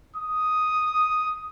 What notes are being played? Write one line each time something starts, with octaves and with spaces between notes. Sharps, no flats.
D#6